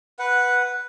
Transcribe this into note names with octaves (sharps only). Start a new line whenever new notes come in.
B4 F#5